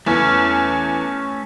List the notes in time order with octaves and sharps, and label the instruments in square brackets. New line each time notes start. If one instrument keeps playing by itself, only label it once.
[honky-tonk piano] E2 [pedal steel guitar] A3 C#4